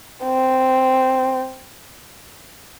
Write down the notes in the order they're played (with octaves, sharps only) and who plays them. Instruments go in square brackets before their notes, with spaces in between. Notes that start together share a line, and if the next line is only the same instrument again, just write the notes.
[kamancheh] C4